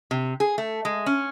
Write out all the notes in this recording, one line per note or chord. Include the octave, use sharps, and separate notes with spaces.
C3
G#4
A3
G#3
C#4